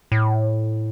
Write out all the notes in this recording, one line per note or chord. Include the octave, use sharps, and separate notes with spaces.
A2